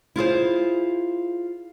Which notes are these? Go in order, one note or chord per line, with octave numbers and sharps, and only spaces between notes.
E4 F4 G#4 C5